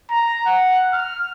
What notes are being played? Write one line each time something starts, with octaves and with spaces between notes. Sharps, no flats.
A#5
F#5
F6